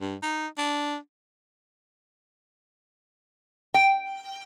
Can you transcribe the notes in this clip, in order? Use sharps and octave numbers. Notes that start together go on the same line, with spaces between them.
G2
D#4
D4
G5